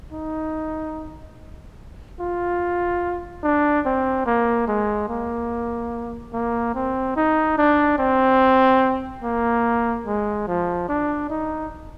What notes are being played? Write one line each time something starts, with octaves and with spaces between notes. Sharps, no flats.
D#4
F4
D4
C4
A#3
G#3
A#3
A#3
C4
D#4
D4
C4
A#3
G#3
F3
D4
D#4